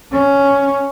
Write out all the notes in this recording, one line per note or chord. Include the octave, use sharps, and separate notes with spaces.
C#4